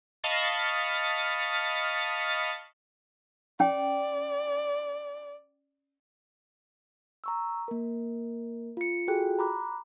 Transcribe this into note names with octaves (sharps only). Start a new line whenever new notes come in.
D#5 F5 A5 B5 C#6 A6
C#4 D5 G5
A#5 C#6 E6
A#3 A#4
F4 C#7
F4 F#4 G#4 A4 G5 F#6
A#5 B5 D6 F#6